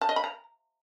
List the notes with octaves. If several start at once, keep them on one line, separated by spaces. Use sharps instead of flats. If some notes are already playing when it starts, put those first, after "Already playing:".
A5
D#5
B5
A#5